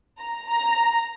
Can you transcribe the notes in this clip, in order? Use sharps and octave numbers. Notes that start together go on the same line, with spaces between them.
A#5
A#5